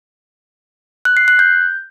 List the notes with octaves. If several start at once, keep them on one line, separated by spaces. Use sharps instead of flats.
F#6
C7
F#6
G6